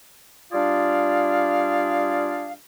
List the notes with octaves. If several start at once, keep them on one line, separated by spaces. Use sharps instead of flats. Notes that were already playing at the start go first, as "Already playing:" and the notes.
G3 D4 F4 G#4 D5 F5